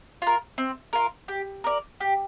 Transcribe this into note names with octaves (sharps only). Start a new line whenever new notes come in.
F4 A#4
C4
F4 A#4
G4
A#4 D5
G4